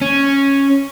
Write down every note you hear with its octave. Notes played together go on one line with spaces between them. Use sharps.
C#4